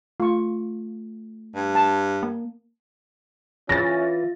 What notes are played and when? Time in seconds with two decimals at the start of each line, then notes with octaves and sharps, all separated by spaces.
0.20 A3 F4 C#6
1.55 G2
1.75 A5
2.23 A#3
3.69 E3 C#4 F4 A6 A#6